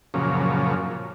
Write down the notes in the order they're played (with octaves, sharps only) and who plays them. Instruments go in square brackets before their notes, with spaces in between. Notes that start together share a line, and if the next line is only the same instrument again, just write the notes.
[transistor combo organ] F#2 A#2 C#3 F3